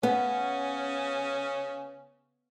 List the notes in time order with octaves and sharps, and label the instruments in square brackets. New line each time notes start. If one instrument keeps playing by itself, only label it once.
[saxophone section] C#3 C#4 [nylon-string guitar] B3